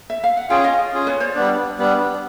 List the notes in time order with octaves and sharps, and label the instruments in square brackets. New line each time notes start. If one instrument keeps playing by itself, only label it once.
[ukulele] E5
F5
F#5
[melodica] C#4 F4 G#4 [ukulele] F5 G5
[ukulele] D#5 F5
[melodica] C#4 F4 G#4
[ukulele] B4 C#5
C5 D5
[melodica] G3 B3 D4
G3 B3 D4